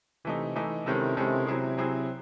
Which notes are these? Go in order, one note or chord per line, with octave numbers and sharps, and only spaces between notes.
C3 E3 A3 D#4
E3 A3 D#4
C3 D#3 G#3 C#4 E4 A4
C3 D#3 G#3 C#4 E4 A4
C3 F#3 C4 E4 G#4
F#3 C4 E4 G#4